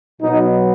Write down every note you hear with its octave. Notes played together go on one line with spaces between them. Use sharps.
B2 F#3 B3 D#4